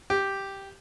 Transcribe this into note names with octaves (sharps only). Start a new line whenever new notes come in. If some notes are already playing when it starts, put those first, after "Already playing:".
G4